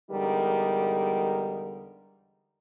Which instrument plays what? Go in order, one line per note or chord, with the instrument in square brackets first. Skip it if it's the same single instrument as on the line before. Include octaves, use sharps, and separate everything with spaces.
[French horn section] E2 D3 G3 G#3 D#4 A#4